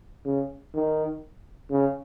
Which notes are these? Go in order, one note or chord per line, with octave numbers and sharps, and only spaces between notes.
C#3
D#3
C#3